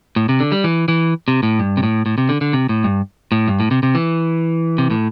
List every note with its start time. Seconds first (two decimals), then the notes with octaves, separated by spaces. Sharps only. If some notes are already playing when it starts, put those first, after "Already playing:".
0.16 A2
0.29 C3
0.40 D3
0.52 G3
0.64 E3
0.88 E3
1.28 C3
1.43 A2
1.59 G2
1.77 C3
1.83 A2
2.06 A2
2.18 C3
2.29 D3
2.41 D3
2.53 C3
2.69 A2
2.84 G2
3.32 A2
3.48 G2
3.60 A2
3.71 C3
3.83 C3
3.95 E3
4.78 C3
4.90 A2